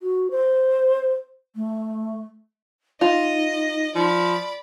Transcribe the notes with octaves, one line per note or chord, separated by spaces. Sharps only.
F#4
C5
A3
D#4 F4 D#5
F3 D5 B5